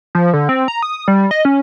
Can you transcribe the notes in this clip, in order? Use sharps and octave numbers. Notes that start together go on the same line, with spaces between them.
F3
D3
C4
A#5
D#6
G3
D#5
C#4